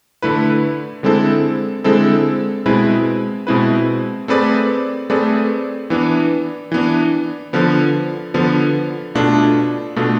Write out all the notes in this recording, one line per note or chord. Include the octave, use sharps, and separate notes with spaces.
D3 A3 E4 B4
D3 G#3 C4 E4 A4
D3 G#3 C4 E4 A4
B2 G#3 C4 E4 B4
B2 G#3 C4 E4 B4
A3 C4 G#4 B4 D5
A3 C4 G#4 B4 D5
E3 B3 D4
E3 B3 D4
D3 F3 B3
D3 F3 B3
B2 A3 D4 F4
B2 A3 D4 F4